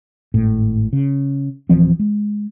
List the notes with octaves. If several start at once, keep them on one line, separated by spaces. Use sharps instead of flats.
G#1 A2
C#3
D1 E3 F3 C4
G#3